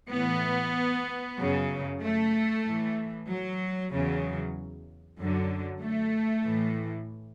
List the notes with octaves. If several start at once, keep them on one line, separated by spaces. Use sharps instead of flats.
A2 E3 B3
F#2 C#3 F#3
A3
A2 E3
F#3
E2 C#3 F#3
F#2 D3 F#3
A3
A2 E3